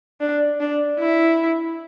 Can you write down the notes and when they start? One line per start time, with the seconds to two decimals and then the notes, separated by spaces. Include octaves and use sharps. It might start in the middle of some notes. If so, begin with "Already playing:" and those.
0.21 D4
0.60 D4
0.99 E4